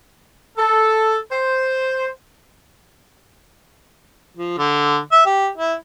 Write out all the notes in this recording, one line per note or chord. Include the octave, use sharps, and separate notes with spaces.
A4
C5
F3
D3
E5
G4
E4